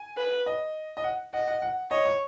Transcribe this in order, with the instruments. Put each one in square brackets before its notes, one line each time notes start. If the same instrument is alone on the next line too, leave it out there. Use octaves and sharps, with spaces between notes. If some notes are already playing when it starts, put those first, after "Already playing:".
Already playing: [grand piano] G#5
[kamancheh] B4
[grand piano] D#5
D#5
F#5
[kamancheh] D#5 [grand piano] F#5
[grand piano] F#5
F#5
[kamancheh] C#5 [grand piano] D#5
[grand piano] C#6